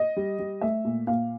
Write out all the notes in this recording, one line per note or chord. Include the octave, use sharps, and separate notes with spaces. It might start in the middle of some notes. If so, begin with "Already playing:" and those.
Already playing: D#5
G3
G3
A3 E5
A#2
A#2 F5